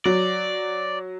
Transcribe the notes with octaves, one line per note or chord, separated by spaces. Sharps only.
F#3 D5